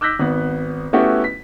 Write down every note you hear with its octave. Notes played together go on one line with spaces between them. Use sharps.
D6 E6 F#6 G6 A#6 B6
G#1 B3
A3 B3 C#4 E4 F#4 G4
B6